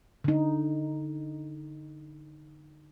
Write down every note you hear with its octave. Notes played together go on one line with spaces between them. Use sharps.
D3 D#4